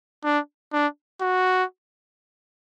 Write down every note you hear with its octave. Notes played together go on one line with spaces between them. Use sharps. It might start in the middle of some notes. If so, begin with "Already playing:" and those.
D4
D4
F#4